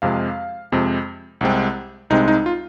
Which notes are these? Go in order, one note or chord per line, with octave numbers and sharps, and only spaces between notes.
F2 C3 G#3 C4 F5
F2 C3 G#3 C4
C2 C3 G#3 C4
C2 C3 G#3 C4 D#4
D#4
F4